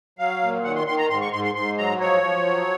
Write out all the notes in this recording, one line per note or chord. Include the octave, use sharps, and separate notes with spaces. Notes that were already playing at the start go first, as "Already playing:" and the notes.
F#3 F5
A#2
D#3 F#5
C6
D#3 C6
A#5
G#2 C6
C#6
G#2 C6
C6
G#2 C6
F#3 A#5
F3 C#5
F3
F#3